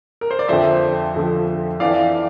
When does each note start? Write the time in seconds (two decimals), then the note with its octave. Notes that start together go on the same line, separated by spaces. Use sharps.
0.21 A#4
0.31 C5
0.39 D5
0.48 F2 D3 F3 C5 E5
1.14 F2 D3 F3
1.80 F2 E3 D5 F5